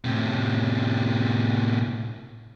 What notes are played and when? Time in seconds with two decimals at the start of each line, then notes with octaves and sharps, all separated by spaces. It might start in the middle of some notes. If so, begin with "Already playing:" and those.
0.05 A2 C3